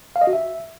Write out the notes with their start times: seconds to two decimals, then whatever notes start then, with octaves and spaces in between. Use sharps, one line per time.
0.16 F5
0.21 D#5
0.27 F#4
0.33 E5